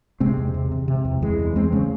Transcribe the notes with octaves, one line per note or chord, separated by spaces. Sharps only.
C3 G#3 C4
E2
C3
C3
C3
E2
E2 E3 G#3
E2
E2 G#3 C4
C#3 A3 C#4